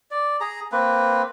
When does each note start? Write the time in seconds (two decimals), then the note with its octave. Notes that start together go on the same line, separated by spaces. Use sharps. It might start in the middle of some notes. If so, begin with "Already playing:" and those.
0.11 D5
0.41 G#4 A#5
0.72 A#3 C4 B4